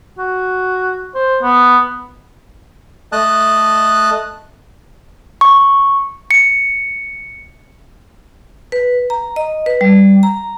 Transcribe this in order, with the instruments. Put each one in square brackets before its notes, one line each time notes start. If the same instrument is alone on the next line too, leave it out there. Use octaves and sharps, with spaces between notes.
[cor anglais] F#4
C5
B3
[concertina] A3 D#5 A5 F#6
[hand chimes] C#6
C#7
[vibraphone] B4
A#5
D#5
B4
G3
A#5